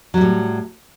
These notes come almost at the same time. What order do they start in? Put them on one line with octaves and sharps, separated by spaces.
F#3 G3 A2